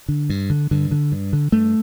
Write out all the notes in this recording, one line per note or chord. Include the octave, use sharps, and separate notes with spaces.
D3
G2
D3
G2 D3
D3
G2
D3
G2 A3